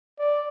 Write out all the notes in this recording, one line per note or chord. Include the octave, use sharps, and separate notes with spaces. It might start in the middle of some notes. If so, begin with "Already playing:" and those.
D5